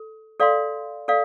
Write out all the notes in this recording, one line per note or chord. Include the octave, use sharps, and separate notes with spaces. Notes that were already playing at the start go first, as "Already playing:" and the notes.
Already playing: A4
A4 D5 F5 C6
A4 D5 F5